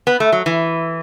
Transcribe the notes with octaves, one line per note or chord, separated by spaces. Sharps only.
B3
A3
F#3
E3